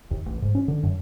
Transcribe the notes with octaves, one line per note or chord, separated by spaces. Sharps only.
D#2
A1
G#2
C#4
D3
F#2